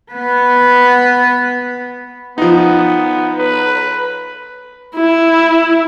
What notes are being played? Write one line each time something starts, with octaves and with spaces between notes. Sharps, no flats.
B3 B4
F3 B3 D#4
B4
E4